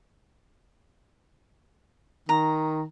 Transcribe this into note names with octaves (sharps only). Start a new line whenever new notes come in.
D#3 A#5